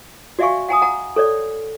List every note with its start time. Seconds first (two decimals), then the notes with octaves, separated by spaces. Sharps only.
0.39 F#4 D5 E5 F5 G#5 C#6
0.69 F#5 G#5 A#5 D#6
0.82 F#5 A#5
1.16 A4 C#5 D5